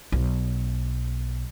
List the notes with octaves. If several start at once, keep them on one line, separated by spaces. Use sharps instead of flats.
B1